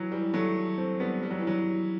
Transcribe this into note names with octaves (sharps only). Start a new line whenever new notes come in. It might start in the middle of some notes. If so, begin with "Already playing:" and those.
Already playing: E3 F#3
E3 G3
F#3 A3
A3 C4
G3 B3
G3
F#3
E3
F#3